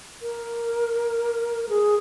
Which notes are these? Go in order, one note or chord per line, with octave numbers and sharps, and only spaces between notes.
A#4
G#4